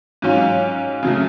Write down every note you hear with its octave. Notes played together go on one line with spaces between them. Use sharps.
G#2 F#3 C#4 F4
C#3 F#3 A3